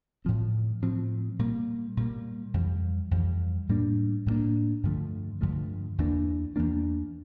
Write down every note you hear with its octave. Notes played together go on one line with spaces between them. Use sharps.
A2 F3 C4
A2 F3 C4
A#2 G3 A#3
A#2 G3 A#3
F2 E3 G3
F2 E3 G3
A2 G3 A#3 D4
A2 G3 A#3 D4
G2 D3 F3 A3
G2 D3 F3 A3
E2 E3 A#3 D4
E2 E3 A#3 D4